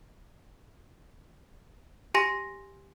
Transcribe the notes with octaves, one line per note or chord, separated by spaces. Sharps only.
G4 G#5 C6 A#6